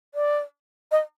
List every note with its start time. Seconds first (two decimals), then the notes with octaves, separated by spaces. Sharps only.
0.15 D5
0.92 D#5